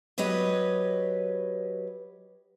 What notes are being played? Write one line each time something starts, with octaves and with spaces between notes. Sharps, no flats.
F#3 G4 B4 C#5 D#5